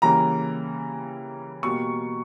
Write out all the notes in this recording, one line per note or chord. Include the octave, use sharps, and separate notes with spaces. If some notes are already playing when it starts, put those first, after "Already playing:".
C#3 E3 G3 A#3 A#5
B2 G3 A#3 C#6